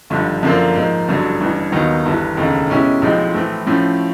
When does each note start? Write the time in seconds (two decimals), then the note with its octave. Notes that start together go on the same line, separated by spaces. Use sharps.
0.10 G#1 G2 D3 F3
0.43 F#2 D3 F3 A#3
0.75 G#2 F3 A#3
1.08 A1 G2 D3 F#3
1.40 A1 G2 E3
1.72 D#2 D#3 F#3 B3 D#4
2.05 G1 G2 E3
2.37 F1 D#2 C#3
2.70 B2 G#3 C#4 E4 G4
3.02 B1 A2 F3 G#3 C4
3.34 A2 E3 A3 C4
3.66 A2 F3 A3 C#4